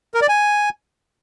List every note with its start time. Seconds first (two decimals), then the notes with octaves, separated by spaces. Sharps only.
0.14 A#4
0.22 D5
0.29 G#5